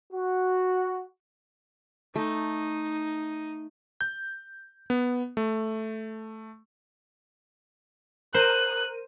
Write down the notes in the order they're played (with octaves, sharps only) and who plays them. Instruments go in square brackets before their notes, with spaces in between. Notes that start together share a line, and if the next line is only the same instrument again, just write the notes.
[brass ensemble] F#4
[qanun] A3 [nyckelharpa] D#4
[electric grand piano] G6
B3
A3
[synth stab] A#4 D#7 [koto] C5 [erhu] F#6